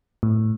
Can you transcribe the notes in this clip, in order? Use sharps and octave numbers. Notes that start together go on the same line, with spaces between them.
A2